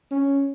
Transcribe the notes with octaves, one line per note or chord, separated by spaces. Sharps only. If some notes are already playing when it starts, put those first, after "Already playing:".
C#4